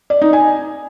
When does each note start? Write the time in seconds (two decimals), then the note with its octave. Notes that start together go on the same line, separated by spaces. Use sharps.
0.10 D5
0.22 D#4
0.33 G#5